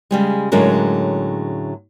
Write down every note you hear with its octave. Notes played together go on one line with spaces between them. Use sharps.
C#3 G3 G#3
A2 D3 F#3 G#3 C#4 A#4